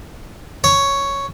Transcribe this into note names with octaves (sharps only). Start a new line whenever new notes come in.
C#5